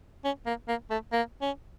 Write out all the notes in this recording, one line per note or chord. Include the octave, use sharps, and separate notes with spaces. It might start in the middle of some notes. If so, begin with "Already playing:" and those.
C#4
A#3
A#3
A3
A#3
C#4